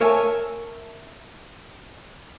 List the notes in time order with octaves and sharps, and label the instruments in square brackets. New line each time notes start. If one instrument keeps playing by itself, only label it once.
[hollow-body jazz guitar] A#4 C#5 E5 G#5 A5